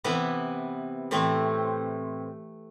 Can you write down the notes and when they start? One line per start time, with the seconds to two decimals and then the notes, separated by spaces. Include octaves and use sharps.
0.04 C3 E3 B3 E4
1.11 A2 E3 A3 C4